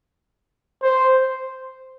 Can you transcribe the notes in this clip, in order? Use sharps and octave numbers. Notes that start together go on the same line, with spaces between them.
C5